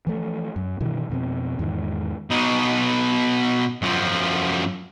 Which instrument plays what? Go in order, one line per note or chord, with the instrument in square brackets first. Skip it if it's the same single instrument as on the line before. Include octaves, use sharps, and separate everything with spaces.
[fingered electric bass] E3 F3 A3
F#2
G2 B2 D#3 E3
F2 B2 C4
E2 G#2 D#3
[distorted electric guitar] B2 D#4
F#2 F3